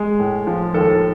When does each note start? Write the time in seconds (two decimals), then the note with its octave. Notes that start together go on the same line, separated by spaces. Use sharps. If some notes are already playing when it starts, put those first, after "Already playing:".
Already playing: G#3 G#4
0.20 A2
0.47 F3
0.74 D#2 A4